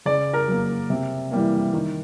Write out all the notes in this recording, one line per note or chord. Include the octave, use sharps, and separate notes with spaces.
C#3 D5
A#4
F#3 A#3
C3
E3 G3 A#3
D#3